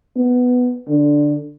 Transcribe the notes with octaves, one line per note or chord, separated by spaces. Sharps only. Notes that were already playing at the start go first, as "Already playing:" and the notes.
B3
D3